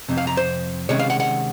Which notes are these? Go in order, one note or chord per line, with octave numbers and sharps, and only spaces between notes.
F2 C3
F5
A#5
C5
C3 D#3 G#3 C#4 C#5
F5
F#5
F#5